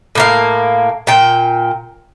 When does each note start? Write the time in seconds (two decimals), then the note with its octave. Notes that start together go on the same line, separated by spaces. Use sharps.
0.15 A2 A#3 F5
1.07 A#2 G5